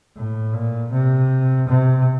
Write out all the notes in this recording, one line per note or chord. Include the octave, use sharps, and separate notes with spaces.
A2
A#2
C3
C3